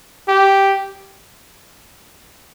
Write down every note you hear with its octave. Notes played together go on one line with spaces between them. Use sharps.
G4